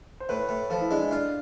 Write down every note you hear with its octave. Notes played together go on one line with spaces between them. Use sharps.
C5
A2 B4
A2
F3 A4
E4
G#3 D4
E4
D4 F4